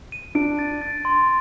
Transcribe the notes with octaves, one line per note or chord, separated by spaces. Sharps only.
D#7
D4 D7
A6
A6
C6